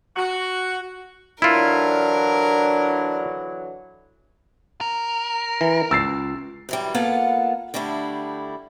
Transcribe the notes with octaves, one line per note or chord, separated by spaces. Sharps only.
F#4
D3 E3 F#3 D4 E4 F4 A#4
A#4
E3
C#2 E6 A6 C7
F#2 E3 G3
A#3 B3 F4 A4 F5 F#5
D3 G3 A3 D4 E4